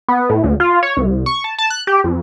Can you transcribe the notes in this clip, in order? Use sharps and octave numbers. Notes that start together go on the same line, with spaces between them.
B3
A2
D2
F4
C#5
C2
C#6
A5
A5
F#6
G4
F2